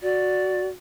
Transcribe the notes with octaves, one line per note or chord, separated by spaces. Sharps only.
F#4 D5